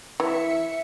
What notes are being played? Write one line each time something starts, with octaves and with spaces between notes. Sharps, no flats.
E3 E4 E5 C#7